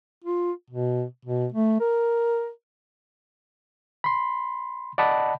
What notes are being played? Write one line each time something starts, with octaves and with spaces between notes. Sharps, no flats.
F4
B2
B2
A3
A#4
B5 C6
D5 D#5 F#5 A5 B5